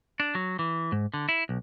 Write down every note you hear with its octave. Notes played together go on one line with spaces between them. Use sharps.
D4
F#3
E3
G#2
D3
E4
B1